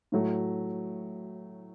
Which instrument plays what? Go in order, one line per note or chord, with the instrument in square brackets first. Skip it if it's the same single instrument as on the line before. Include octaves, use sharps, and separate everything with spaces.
[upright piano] A2 F#3 A3